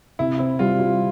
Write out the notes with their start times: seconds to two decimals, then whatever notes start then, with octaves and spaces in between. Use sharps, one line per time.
0.19 C3 E4
0.39 C4 E4
0.59 G3 F4
0.80 F4